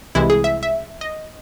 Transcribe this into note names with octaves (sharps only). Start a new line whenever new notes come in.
C2 C3 E3 G#3 E4
G#4
E5
E5
D#5